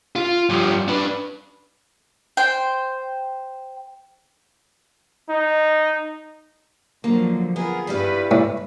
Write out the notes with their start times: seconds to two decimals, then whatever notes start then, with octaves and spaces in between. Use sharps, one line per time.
0.16 F4
0.49 G2 F3
0.88 D4 B4
2.37 C5 G5
5.29 D#4
7.04 D3 F3 F#3 A#3
7.56 B3 F4 G#4 A#4
7.87 G2 G3 E4 B4 F5
8.31 A2